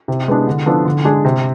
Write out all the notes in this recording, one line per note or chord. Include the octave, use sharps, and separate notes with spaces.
C3
G#3 B3 D4
D3
F3 B3 D4 A4
D3
G#3 D4 G#4
C3